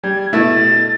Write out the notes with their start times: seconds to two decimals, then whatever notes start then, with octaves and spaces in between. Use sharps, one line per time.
0.04 G3 G#6
0.33 B2 A3 E4 A6